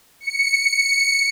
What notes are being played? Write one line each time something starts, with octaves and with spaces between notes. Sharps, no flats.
C#7
C#7